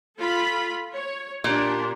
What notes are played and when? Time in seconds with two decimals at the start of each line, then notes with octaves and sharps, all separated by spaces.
0.19 F4 A4 B5
0.94 C#5
1.44 A#2 D4 G4